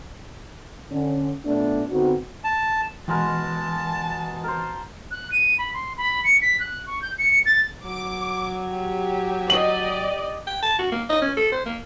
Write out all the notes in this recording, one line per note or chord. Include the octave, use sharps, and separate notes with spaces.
D3 C#4
A#2 A3 B3 D4
D3 B3 C4 D#4 F#4
A5
B2 E3 G#3 A#4 A5
A#4 C5
F#6
D#7
B5
C6
B5
C#7
B6
F#6
C#6
G6
C#7
A6
F#3 D6
G4
D5 D#5 F#7
G5
A5
F#4
A#3
D#5
C#4
A4
C5
A#3